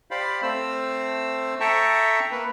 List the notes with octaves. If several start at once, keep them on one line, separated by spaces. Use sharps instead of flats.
G4 C5 D5 F5 B5
A3 C4 C5 E6
A4 E5 G5 A5 A#5 C#6
A#3 B4